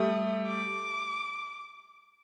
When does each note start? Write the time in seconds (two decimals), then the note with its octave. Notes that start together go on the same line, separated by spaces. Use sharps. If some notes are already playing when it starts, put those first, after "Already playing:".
Already playing: G3 A3 D#6
0.47 D6